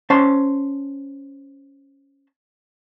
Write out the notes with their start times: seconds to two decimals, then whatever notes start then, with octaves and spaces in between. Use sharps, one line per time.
0.10 C#4 C5 A5